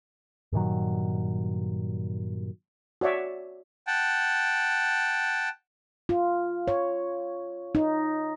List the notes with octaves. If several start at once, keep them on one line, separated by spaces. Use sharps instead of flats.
G2 A#2 D#3 F#3
F#4 C#5 D5 E5
F#5 G5 A5
F4
C#5
D#4